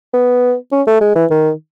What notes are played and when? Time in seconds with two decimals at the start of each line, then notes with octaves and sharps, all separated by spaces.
0.13 B3
0.72 C#4
0.87 A3
1.01 G#3
1.15 E3
1.31 D#3